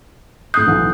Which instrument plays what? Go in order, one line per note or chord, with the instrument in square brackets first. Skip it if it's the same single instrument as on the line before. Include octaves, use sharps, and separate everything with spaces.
[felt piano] A2 C7 [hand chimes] D#6 F#6 G6
[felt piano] B1 E3 F#5